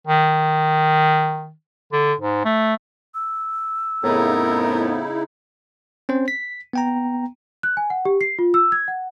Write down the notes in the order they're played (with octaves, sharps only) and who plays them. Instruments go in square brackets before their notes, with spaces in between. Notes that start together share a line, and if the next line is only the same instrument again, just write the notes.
[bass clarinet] D#3
D3
G#2
A3
[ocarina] E6
[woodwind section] F2 A2 B3 [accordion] C#3 D#4 E4 [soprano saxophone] A#4
[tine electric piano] C4 C#4 C5
B6
B3 G5 A#5
[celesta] F#6
G#5
F#5
G4
C7
F4
E6
G#6
F#5